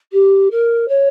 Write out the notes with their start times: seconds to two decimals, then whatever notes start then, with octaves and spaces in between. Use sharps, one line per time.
0.12 G4
0.51 A#4
0.88 C#5